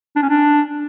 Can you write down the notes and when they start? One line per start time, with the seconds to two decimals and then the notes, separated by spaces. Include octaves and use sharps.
0.16 D4
0.22 C#4
0.29 D4